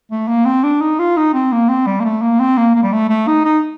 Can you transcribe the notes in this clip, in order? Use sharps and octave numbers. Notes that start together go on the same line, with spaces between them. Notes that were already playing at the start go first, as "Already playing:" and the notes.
A3
A#3
C4
D4
D#4
F4
D#4
C4
A#3
C4
G3
A#3
A3
A#3
C4
A#3
A#3
G3
A3
A3
D#4
D#4